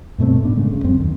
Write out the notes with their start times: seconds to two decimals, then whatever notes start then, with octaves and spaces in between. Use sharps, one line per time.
0.18 G2 B2 A3 C4
0.44 A2 B3 D4
0.56 C#3 G#3 A3
0.71 G1 C#3
0.84 F#2 C4
1.01 D#2